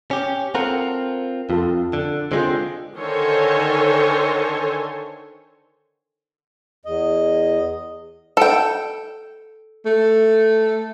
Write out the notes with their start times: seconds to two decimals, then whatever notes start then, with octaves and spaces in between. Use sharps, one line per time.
0.11 C#4 G4
0.55 C4 F4 A4 A#4 F#5
1.50 F2 F4 A4
1.93 D3
2.32 D3 G#3 C4 F4 G#4 C5
2.96 D3 D#3 A4 C5 C#5 G#5
6.85 E2 D#5
8.37 A4 G5
9.86 A3